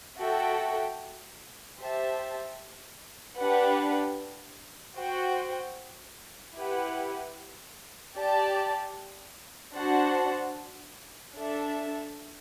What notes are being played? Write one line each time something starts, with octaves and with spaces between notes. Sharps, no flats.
F#4 A4 E5 G5
G4 C5 E5 A5
D4 G4 B4 F#5
F#4 C5 G5
E4 G4 B4 F#5
G4 D5 A5
D4 F#4 C5 F#5 A5
D4 A4 E5 A5